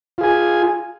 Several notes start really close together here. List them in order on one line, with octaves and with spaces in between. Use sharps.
F4 G#4 G#5